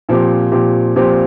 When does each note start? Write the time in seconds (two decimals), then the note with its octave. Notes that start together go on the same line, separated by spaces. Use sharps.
0.09 A#2 F3 C4 G4
0.52 A#2 F3 C4 G4
0.96 A#2 F3 C4 G4